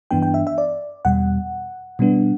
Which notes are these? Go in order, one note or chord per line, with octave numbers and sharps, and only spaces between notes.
G2 E3 B3 D4 G5
G5
E5
E5
D5
E2 B2 G3 F#5
B2 G3 B3 D4